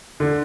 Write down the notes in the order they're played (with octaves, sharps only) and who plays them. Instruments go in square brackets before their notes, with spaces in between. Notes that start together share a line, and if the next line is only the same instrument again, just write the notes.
[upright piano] D3